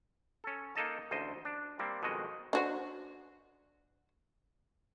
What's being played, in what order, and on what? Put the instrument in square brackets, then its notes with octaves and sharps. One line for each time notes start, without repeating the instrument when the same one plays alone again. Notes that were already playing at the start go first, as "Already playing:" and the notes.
[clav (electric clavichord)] C#4 A4
A#3 D#4 A4 D#5 A5
A1 D2 C5 D#5
D4
G3 A#3 C4
F2 B2 D#3 G#3 F#4 D#5
[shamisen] D4 F#4 C5